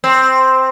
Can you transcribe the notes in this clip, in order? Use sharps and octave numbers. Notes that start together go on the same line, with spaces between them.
C4